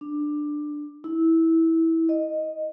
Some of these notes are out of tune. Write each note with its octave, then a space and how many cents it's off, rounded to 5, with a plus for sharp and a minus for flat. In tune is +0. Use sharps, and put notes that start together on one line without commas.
D4 +15
E4 -15
D#5 -5